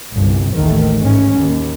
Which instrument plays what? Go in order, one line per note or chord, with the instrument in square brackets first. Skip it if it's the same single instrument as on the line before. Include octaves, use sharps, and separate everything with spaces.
[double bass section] G1 C2
A1 D#2 D#3 A3
G#2 C#4
D#2